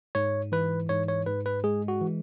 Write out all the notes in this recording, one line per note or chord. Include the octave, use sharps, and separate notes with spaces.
G#2 C#5
E3 B4
G#2 C#5
C#5
G#2 B4
B4
G#3 G#4
F#4
E3